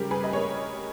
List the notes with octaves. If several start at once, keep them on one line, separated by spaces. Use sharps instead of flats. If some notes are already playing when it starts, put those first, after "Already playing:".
Already playing: C#3 G3 G4 A#4
G#4 B4
D#5
A#4 C#5